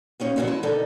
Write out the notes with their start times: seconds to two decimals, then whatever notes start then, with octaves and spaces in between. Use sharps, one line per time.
0.20 A#3 C#4 D#4 G4
0.36 F2 C#3 F#3 A3 B3 D#4
0.47 E3 G#3 E4 A5
0.63 B2 D3 D#3 D#4 A4